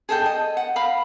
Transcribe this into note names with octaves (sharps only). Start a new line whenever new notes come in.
G#4 A4 D#5 G5
D#5
F#5
F5 A#5 B5